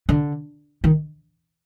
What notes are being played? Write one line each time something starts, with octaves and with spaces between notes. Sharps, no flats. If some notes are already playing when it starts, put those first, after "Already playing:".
D3
D#3